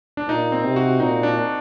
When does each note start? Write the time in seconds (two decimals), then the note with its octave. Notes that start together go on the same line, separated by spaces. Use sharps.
0.17 D4
0.28 A#2 D#4
0.52 C4
0.65 C3
0.76 F#4
1.00 A#2 D#4
1.23 D4